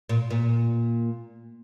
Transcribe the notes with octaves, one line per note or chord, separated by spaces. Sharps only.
A#2
A#2